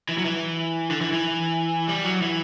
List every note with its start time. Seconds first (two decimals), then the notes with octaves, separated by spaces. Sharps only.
0.09 E3
0.18 F#3
0.25 E3
0.90 D3
1.01 E3
1.13 E3
1.88 G3
2.04 F#3
2.21 E3